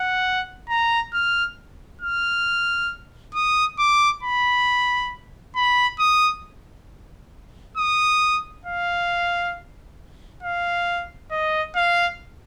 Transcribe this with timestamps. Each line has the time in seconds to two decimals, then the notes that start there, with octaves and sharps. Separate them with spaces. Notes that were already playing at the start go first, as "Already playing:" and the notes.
Already playing: F#5
0.69 A#5
1.14 F6
2.02 F6
3.35 D#6
3.79 D6
4.23 B5
5.56 B5
6.00 D#6
7.77 D#6
8.66 F5
10.43 F5
11.31 D#5
11.76 F5